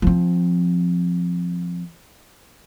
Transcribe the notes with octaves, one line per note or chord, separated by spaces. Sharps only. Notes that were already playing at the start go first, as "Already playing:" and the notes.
F3 C4